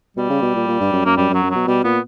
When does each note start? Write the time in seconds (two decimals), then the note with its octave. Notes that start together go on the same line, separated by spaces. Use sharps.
0.16 B2 G3
0.29 C#3
0.42 B2
0.55 A#2
0.68 A#2
0.80 G2
0.92 F#2
1.05 F#2 A#3
1.17 F#2 G3
1.29 F#2
1.34 F#3
1.43 F#2
1.51 B2 F#3
1.67 B2 G3
1.84 A#2 B3